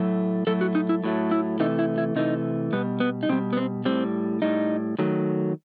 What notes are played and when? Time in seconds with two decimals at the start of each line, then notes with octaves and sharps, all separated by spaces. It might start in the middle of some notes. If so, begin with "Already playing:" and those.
Already playing: A2 F#3 A3
0.47 A2 F#3 A3 A4
0.61 F#4
0.75 D#4
0.89 E4
1.04 A2 F#3 A3
1.31 E4
1.60 C3 E3 A3 D#4
1.79 E4
1.98 E4
2.16 C3 E3 A3 D#4
2.73 B2 G3 B3
3.00 B3
3.23 D#4
3.29 B2 G3 C4
3.53 B3
3.57 C4
3.85 A2 G3 C4
4.42 A2 G3 D#4
4.99 D#3 F#3 A3